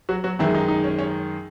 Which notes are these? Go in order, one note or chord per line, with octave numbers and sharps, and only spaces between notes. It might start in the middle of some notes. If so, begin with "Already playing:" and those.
F#3 F#4
F#3 F#4
F#2 D#3 E3 G#3 E4
D#4
D#4
C#4
C#4